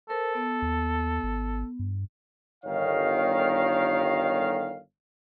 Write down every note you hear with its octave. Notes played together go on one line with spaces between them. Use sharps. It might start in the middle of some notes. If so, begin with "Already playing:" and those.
A4 A#4 C5
B3
D#2
G#1
G2
G1 D#3 C#5 F5